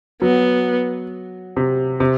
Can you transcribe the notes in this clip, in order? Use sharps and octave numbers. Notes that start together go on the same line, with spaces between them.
F#3 B3
C3
C3